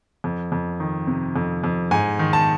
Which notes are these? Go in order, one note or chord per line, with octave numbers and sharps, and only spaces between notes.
F2
F2
D#3
C3
F2
F2
G#2 G#5
D#3
A5